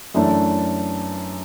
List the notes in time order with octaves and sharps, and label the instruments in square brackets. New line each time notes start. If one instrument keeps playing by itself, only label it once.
[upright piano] F#2 E3 A3 D4